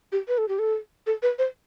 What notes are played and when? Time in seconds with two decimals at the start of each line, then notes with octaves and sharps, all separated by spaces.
0.12 G4
0.28 B4
0.38 A4
0.48 G4
0.59 A4
1.07 A4
1.22 B4
1.39 C5